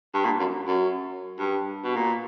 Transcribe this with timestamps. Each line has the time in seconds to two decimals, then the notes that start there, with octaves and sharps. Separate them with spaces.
0.14 G2
0.25 A#2
0.40 F#2
0.67 F#2
1.39 G2
1.84 B2
1.96 A#2